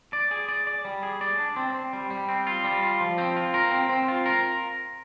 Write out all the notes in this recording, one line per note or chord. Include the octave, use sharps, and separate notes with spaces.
D5
G#4
D5
D5
G3
G#4
D5
D4
C4
C4
G3
G3
C4
F4
G3
F4
F3
C4
F4
A#4
C4
C4
F4
A#4